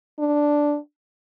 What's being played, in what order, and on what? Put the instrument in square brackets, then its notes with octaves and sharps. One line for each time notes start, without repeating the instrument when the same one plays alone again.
[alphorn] D4